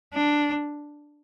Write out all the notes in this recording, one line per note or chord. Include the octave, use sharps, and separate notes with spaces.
D4